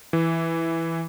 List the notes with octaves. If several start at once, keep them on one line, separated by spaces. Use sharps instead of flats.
E3